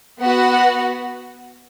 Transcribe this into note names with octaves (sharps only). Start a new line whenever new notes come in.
B3 F#4 B4 F#5